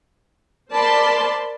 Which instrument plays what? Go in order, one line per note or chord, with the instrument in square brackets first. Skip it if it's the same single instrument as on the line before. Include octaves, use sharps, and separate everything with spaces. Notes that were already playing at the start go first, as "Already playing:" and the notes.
[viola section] A#4 C5 D5 A5 B5 C6